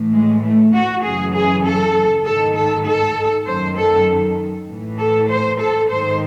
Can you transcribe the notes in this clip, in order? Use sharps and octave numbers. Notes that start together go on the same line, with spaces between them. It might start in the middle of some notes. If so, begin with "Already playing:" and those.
Already playing: A2 E3
G#3
A3
F#4
F#2 C#3 E3 G#4
G#4
A4
G#2 D#3 A4
A4
A4
F#2 D#3 C5
A4
A2 E3
A4
C5
A4
G#2 D#3 C5